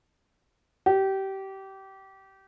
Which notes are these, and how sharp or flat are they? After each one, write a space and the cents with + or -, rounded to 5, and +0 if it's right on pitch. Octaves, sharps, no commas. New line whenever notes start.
G4 -25